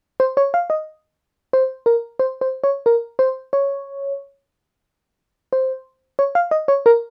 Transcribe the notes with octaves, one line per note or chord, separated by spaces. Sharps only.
C5
C#5
F5
D#5
C5
A#4
C5
C5
C#5
A#4
C5
C#5
C5
C#5
F5
D#5
C#5
A#4